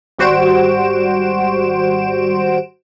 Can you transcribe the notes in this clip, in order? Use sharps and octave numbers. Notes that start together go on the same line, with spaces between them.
G#1 G3 F#4 C5 D7 E7